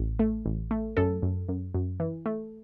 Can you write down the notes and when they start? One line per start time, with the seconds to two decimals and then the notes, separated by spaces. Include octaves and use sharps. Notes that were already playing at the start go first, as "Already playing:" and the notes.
Already playing: A1
0.19 A3
0.46 A1
0.71 A3
0.97 F#2 A4
1.22 F#2
1.49 F#2
1.74 F#2
2.00 E3
2.26 A3